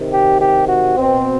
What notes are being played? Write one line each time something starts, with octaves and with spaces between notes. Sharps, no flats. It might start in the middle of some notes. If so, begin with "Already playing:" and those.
Already playing: C3 D#3
G4
G4
F#4
B2 C4